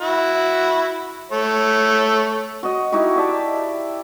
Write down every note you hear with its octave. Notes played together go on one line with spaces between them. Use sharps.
E4 F#4
A3 C#5
F#4 D#5
D#4 E4 F#4 G4
G4 D5 E5 A5